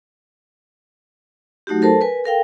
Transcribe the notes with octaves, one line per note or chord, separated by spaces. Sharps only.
F#3 A3 D#4 F#4 G4
A4 A#4 C5 A5
A#4 B4 G#5
A4 A#4 F5 G5